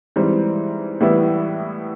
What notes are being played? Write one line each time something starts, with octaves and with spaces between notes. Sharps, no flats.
G#2 E3 G3 C4
A2 E3 G3 B3 E4